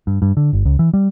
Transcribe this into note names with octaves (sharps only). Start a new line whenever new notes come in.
G2
G2
D3
G1
C#2
E3
G3